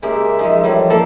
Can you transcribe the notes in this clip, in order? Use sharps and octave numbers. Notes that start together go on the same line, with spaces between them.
C#3 G#3 A#3 G4 E5
F3 G#3 D#4
A2 E3 F3 G3
F3 A#3 A4 E5